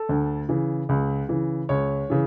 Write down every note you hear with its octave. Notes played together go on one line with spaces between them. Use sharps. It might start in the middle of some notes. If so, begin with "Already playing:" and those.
Already playing: A4
D2
C#3 E3
C#2
C#3 E3
C#2 C#5
C#3 E3